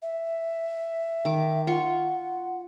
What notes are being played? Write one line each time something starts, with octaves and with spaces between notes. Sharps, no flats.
E5
D#3 D6
F4 F#5 C6 C#6